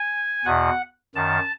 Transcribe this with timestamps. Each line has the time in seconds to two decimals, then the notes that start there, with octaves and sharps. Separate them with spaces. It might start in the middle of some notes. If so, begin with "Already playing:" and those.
Already playing: G#5
0.45 E2 B2 F#5
1.15 F#2 D#3 A5